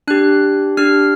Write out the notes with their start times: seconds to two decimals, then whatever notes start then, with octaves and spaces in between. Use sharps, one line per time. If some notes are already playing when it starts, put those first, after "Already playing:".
0.08 D4 G4 F#6
0.77 D4 G4 F6